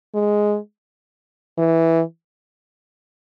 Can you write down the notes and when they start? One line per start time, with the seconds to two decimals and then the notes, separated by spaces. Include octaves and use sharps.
0.15 G#3
1.59 E3